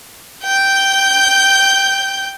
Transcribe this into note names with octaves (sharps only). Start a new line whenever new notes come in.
G5 G6